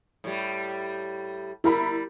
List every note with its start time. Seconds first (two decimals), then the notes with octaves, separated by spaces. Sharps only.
0.24 A2 G3
1.64 G3 E4 A#4 B5